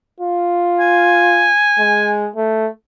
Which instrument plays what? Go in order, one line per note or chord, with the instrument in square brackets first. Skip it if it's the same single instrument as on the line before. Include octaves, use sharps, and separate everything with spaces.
[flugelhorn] F4
[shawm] G#5
[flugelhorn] G#3
A3